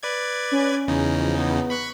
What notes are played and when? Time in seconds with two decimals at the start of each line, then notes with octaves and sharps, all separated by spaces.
0.03 B4 D5 G#6
0.52 C#4
0.88 E2 C#3 D#4
1.20 F3
1.38 B3
1.70 B5 C#6 F#6